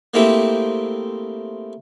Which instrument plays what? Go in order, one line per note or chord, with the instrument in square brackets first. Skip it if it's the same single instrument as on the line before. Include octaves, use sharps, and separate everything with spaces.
[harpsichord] A3 A#3 C4 E4 G4 G#4